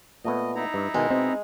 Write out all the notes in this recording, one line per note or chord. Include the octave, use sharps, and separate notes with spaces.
A#2 A3 B3 D#5
D#4 E4 A#5
G2
B2 D#3 G#3
B2 C4